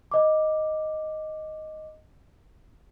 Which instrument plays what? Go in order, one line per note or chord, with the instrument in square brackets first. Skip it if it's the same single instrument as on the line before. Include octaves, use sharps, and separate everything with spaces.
[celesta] D#5 D6